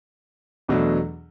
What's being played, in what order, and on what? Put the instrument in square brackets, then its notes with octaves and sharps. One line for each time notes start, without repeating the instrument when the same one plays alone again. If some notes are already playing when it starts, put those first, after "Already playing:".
[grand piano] E2 B2 F#3 A3 D4